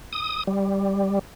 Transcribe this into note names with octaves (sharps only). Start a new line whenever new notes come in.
D#6
G3